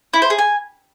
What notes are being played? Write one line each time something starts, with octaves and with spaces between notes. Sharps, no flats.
E4
C5
G#4
G#5